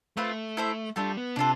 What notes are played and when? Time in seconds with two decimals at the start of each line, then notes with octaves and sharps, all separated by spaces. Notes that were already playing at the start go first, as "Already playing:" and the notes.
0.17 A3 C4 F4 B4
0.57 E4 A4 C5 E5
0.96 G3 A3 D4 F4
1.17 B3
1.36 C3 D4 F4 A4